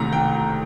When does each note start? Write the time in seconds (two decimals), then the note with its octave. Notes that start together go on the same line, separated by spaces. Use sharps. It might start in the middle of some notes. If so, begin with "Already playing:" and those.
Already playing: C2 C3 D#3 A3 A#5
0.13 G5